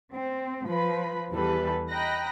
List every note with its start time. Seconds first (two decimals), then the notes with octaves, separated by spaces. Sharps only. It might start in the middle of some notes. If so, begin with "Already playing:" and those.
0.13 C4
0.68 F3 B4 B5
1.32 E2 E3 G3 A4 B4
1.90 D#5 G5 A#5 B5 F#6 A#6